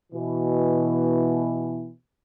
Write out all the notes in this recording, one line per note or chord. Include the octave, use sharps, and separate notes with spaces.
B2 E3